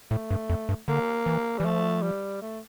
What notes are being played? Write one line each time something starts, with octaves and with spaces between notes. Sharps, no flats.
A2 A3
G2
F2
G2
D3 A#3
E3
E3 G3
F3 A3
G3
A3